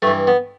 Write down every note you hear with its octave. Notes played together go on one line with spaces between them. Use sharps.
G2 E3 A3
B3